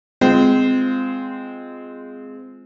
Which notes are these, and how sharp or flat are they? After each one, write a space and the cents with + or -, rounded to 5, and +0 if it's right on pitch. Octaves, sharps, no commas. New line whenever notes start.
G#3 +0 C4 -20 F4 +0